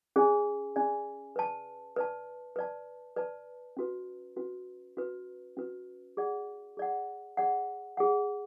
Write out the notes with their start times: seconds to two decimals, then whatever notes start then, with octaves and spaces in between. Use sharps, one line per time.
0.16 C#4 G#4 D5 G#5
0.76 C#4 G#4 D5 G#5
1.36 B4 D5 A5
1.96 B4 D5 A5
2.56 B4 D5 A5
3.16 B4 D5 A5
3.77 C#4 F#4 B4
4.36 C#4 F#4 B4
4.97 C#4 F#4 B4
5.57 C#4 F#4 B4
6.17 G#4 D5 F#5
6.77 G#4 D5 F#5
7.37 G#4 D5 F#5
7.97 G#4 D5 F#5